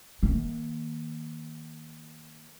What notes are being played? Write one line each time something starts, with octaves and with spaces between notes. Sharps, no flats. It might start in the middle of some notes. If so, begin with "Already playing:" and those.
D#3 A#3